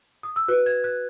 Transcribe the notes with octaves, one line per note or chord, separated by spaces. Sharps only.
D#6
E6
F#4 B4 F#6
G#6
F#6